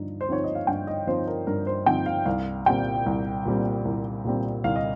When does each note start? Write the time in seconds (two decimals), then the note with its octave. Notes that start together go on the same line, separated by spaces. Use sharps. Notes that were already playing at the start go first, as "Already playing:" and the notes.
Already playing: G2 F3 D#4
0.21 C5
0.28 F3 C4 D#4 C#5
0.44 D#5
0.55 F5
0.67 G2 G5
0.87 D#5
1.07 F3 C4 D#4 C5
1.28 A#4
1.47 G2 A#4
1.67 C5
1.86 F3 C4 D#4 G5
2.06 F5
2.26 C2 F5
2.66 A#2 G3 C4 G5
3.06 C2
3.45 A#2 G3 C4
3.85 C2
4.24 A#2 G3 C4
4.64 C2 F5
4.76 D#5